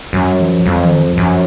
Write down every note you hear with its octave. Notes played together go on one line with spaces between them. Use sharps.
F#2 F#3
F3
F2 F#3
F3
D#3
F3
F#2